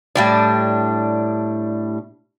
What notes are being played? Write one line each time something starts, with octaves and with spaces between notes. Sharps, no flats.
A2 G3 D4